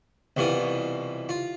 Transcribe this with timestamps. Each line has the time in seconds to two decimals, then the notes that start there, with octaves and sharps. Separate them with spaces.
0.37 C2 B2 E3 F4 D#6
1.29 F4